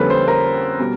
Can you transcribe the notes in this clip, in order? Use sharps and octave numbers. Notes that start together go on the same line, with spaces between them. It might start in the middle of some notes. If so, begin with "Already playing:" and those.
Already playing: F2 D3 G3 A#3 C#4 A4 B4
C5
A#4
B2 G3